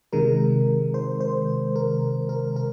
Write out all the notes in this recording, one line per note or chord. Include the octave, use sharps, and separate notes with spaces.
C3 D#3 G#3 A#4
C5
C5
A#4
A#4
A#4